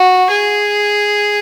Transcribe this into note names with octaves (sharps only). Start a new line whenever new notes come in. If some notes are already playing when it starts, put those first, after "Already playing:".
Already playing: F#4
G#4